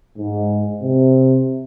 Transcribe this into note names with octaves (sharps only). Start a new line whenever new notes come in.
G#2
C3